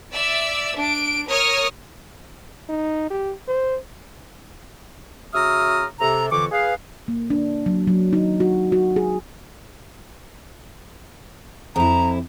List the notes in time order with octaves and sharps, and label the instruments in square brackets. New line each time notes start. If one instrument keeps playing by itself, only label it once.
[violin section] D5 E5 E6
D4 D7
A#4 C#5 D#6 F6
[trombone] D#4
G4
C5
[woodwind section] C#3 F#4 E5 A#5 D#6 F6
C3 A4 A#5
F2 D3 E3 C#6 D6
G#4 B4 F5
[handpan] A#3
D4
F#3
F#3
D#4
F#4
F#4
G#4
[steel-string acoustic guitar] F2 E4 [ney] A#5